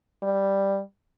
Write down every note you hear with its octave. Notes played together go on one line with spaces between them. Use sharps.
G3